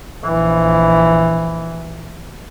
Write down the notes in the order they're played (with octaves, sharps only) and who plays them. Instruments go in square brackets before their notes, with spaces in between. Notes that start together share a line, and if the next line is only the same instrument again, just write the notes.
[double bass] A#1 E3